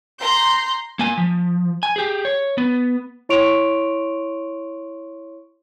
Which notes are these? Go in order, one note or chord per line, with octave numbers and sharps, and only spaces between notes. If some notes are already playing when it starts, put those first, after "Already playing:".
A#5 C6 G6
A#3 G#5
F3
G#5
G4 G#4
C#5
B3
E4 C#5 C6 C#6 D7 F7